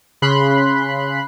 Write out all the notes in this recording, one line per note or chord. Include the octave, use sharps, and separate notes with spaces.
C#3 B5 C6 F#6